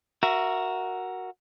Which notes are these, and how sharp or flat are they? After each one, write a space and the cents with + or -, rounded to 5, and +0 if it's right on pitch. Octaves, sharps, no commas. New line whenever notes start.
F#4 +0 A#4 +5 E5 +25